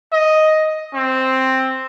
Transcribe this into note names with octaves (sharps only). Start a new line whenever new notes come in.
D#5
C4